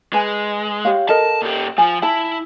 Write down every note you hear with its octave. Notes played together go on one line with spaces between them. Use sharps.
G#3 B4 G#5
G4 C#5 F5
A4 A#4 D#5 A5
A#2 G4
F3 F4 G#5
E4 A5